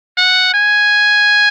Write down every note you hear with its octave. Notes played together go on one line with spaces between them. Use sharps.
F#5
G#5